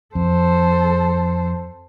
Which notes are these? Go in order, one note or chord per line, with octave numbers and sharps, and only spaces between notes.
F2 A4 C5